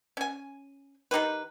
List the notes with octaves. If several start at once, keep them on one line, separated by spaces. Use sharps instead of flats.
C#4 G#5
D#3 D#4 G4 B4